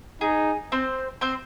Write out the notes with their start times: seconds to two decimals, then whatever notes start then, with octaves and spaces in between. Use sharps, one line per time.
0.21 D#4 G#4
0.72 C4 C5
1.21 C4 C5